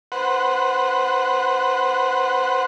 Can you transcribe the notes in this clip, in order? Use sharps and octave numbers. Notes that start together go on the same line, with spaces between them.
B4 C5 F#5